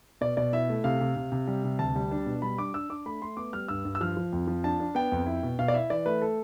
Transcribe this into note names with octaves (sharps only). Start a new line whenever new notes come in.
B2 D5
B2 D5
E4 E5
A3
C3 F5
C3
C3
C3
G3
C3
D2 A5
G3
D4
B2
G3 B5
D4 D6
D4 E6
D4 D6
A3 B5
A3 C6
B3 D6
G3 F6
G2 E6
G2
E6
F3 F6
F3
F2
F3
D4 A5
D4
B3 G5
F2
E4
B2
B2 F5
D5
E4 E5
E3 D5
A3 B4
A4